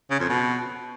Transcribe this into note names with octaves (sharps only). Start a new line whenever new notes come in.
C#3
F2
B2